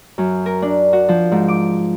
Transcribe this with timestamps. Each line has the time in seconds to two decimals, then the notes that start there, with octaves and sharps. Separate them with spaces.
0.18 F#2
0.46 A#4
0.62 D4
0.93 F#4
1.09 F3
1.32 G#2
1.48 D6